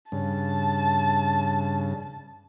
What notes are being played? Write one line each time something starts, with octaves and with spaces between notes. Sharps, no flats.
G2 C#3 A5